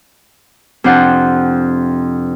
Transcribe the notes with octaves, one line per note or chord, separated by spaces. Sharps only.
F2 C3 D4 C5 F#5